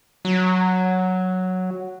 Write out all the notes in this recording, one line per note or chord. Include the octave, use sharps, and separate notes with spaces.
F#3